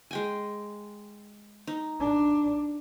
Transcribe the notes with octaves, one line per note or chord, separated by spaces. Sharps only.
G#3 G5 G#5
D#4
D4